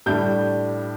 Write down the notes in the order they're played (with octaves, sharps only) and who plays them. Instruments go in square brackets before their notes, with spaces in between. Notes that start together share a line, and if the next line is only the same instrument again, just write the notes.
[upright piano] A2 G3 D4 G6